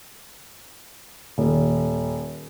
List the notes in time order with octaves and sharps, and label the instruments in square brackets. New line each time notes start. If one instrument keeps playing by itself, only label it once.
[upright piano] D#1